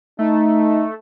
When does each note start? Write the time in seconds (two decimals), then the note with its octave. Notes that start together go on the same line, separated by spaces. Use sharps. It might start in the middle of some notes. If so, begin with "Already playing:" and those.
0.19 A3 D#4